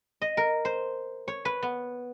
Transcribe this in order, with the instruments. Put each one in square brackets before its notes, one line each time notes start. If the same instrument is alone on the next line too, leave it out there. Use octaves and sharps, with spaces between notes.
[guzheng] D#5
A#4
C5
C#5
B4
B3